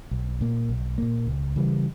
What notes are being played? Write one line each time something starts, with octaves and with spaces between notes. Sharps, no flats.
B1
A#2 A#3
B1
A#2 A#3
C#2
C#3 E3 G3